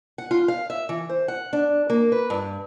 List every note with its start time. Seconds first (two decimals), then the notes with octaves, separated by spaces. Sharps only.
0.18 F#5
0.31 F4
0.48 F5
0.70 E5
0.89 E3
1.09 C5
1.28 F#5
1.53 D4
1.90 A#3
2.12 B4
2.30 G2